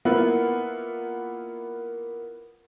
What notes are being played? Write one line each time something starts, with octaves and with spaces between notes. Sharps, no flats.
A#3 B3 E4 F4 F#5